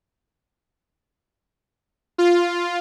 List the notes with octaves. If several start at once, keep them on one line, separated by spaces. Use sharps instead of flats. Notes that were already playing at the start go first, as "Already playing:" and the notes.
F4